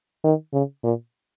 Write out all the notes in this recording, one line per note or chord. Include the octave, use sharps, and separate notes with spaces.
D#3
C#3
A#2